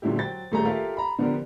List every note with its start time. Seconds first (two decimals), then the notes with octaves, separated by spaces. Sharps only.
0.02 A#2 D3 F#3 G#3 E4 G4
0.16 F#3 C5 G5 A6
0.52 D#1 G3 A3 G4 G#4 A#5
0.65 F4 G4 A4 A#4 E5 F5
0.97 A#5 B5
1.18 D3 F3 B3 D4 G4 A#4